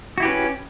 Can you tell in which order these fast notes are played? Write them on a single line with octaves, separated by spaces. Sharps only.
F#4 E4 G4 B4 C#4